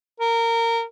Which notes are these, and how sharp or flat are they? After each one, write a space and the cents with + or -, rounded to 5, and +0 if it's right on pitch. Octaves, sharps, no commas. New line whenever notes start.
A#4 -20